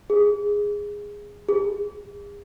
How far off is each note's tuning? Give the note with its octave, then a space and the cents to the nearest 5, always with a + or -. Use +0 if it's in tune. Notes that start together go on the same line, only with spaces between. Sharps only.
G#4 -10
G#4 -40